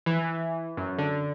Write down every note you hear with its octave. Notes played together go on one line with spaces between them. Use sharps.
E3
F#2
D3